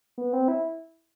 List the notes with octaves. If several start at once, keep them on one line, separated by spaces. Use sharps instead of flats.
B3
C4
E4